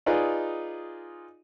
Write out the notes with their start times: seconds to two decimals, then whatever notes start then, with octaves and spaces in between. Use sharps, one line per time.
0.06 D#4 F4 G#4 B4 D5 D#5